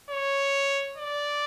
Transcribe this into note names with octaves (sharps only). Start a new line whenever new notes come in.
C#5
D5